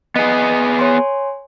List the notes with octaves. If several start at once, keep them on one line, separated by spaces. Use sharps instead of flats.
B3 G#4 D#5
C#5 G#5 C6